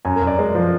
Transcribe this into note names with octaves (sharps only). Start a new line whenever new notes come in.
F#2 G#5
A#4
F#2
D5
G#3
F3